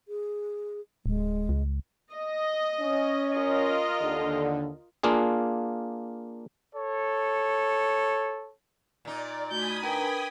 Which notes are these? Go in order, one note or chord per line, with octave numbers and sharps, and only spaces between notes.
G#4
D1 G#3
C#2
D#5
C#4
F4 A#4 D#5
D#2 D3
A#3 D4 F4 G#4
A4 C#5
A#2 D#4 D5
A3 F#4 G#5 B5 D#6 G6
D4 A#4 B4 G5